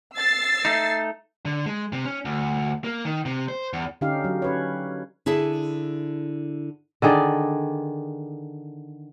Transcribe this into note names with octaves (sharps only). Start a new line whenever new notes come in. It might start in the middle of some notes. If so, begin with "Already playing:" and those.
E6 A6 C7
A3 D#4
D3
G#3
C3
C#4
D2
A#3
D#3
C3
C5
E2
D3 C#4 D#4 G4 F5
F#3
C#4 B4 C#5
D3 E4 G#4 E5 A5
D3 D#3 G#4 D5